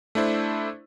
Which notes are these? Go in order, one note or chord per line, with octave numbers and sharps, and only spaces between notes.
A3 D4 E4 C5